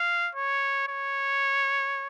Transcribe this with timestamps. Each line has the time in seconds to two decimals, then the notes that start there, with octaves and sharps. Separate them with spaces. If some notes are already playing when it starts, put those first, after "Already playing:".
Already playing: F5
0.35 C#5
0.88 C#5